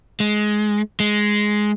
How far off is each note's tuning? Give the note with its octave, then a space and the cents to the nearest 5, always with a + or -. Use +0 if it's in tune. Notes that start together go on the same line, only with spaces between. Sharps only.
G#3 +15
G#3 +5